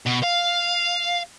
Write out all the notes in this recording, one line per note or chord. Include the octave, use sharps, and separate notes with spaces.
B2
F5